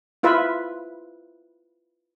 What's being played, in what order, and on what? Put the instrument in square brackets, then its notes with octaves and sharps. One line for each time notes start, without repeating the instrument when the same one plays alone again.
[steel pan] E4 F4 B4 E5